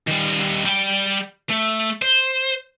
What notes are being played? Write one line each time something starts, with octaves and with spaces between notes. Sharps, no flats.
D#3 G3
G3 G5
A3
C5